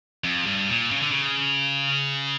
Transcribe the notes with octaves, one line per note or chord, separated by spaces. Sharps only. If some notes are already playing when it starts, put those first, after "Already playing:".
F2
G2
A#2
C#3
D3
C#3